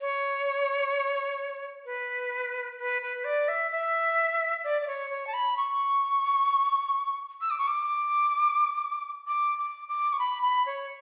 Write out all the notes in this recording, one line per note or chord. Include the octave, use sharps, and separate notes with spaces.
C#5
B4
B4
B4
D5
E5
E5
D5
D5
C#5
C#5
A5
B5
C#6
E6
D6
C#6
D6
D6
D6
D6
C#6
B5
B5
C#5